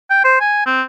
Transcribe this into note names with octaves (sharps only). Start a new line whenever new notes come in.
G5
C5
G#5
C4